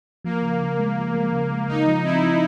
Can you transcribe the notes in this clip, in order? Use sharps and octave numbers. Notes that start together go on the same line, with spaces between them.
F3 A#3
C#3
C#3
G#3
F3
G#3
C#3
G#3
C#3 D#4
F3
C4 E4
F3